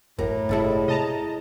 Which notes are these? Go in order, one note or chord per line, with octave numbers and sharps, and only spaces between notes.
A1 F#2 A2 A#4
G1 C3 G3 G#3 E4 A4
C3 D#5 A5 A#5